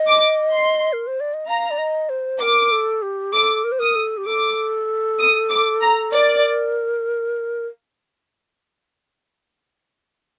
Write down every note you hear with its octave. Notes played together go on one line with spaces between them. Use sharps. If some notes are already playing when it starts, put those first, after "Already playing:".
Already playing: D#5
D6
C6
A#4
C5
D5
D#5
F5 A#5
D5
D#5
C5
A#4 D6
A4
G4
A4 D6
A#4
C5
A#4 D#6
A4
G4
A4 D6
D#6
D6
A#5
A#4 D5